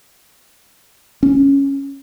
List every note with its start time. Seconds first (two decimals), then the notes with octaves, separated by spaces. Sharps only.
1.23 C#4